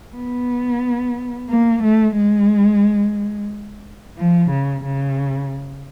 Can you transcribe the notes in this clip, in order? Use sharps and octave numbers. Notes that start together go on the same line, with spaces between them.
B3
A#3
A3
G#3
F3
C#3
C#3